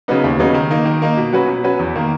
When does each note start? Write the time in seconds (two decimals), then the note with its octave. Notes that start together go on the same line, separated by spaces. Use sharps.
0.08 C#3 F#3 B3 D#4
0.24 D#2
0.39 C#3 F#3 B3 D#4
0.54 D#3
0.71 A#3 D#4
0.85 D#3
1.02 A#3 D#4
1.17 B2
1.33 F#3 C#4 F#4 B4
1.48 B2
1.63 F#3 C#4 F#4 B4
1.79 E2
1.96 D#3 A#3